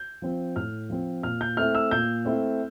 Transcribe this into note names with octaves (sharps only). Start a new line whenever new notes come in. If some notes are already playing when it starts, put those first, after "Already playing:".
Already playing: G6
F3 C4
A2 F6
F3 C4
A#2 F6
G6
A3 C4 E4 F6
E6
A#2 G6
A3 C4 E4